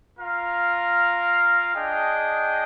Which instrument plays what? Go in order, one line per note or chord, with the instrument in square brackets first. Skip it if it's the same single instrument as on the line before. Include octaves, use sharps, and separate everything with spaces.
[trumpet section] F4 A#4 F5
D4 G#4 D#5 G5